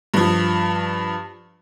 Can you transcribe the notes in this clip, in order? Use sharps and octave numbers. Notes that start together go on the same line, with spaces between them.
G2 F3